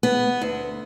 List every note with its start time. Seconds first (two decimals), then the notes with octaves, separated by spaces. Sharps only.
0.03 B3
0.42 D2